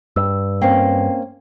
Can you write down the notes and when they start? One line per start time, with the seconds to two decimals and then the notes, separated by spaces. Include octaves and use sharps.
0.16 G2 E6
0.61 A#3 C4 C#4 G5 C7